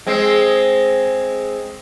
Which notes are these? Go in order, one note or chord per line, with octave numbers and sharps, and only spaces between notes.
G#3 C4